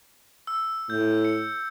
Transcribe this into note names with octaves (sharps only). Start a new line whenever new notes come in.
E6
A2 G6
C#7